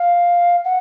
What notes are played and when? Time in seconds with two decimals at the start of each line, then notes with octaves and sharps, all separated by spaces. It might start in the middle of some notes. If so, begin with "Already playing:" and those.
Already playing: F5
0.65 F#5